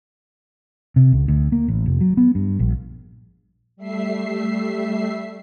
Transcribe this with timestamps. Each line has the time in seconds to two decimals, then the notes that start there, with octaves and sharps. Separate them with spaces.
0.96 C3
1.13 C#2
1.28 D2
1.52 A#3
1.68 A1
1.86 F1
2.01 F#3
2.17 B3
2.35 G2
2.59 A#1
3.76 G3 A3 E5 C7